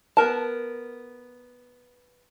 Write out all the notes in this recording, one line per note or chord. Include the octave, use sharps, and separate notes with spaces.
B3 A#4 A5